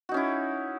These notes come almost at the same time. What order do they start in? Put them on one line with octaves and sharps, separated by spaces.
F#4 D#4 C#4 E4